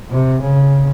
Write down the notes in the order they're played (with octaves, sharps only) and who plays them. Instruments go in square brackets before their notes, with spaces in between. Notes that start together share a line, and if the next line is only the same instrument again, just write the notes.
[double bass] C3
C#3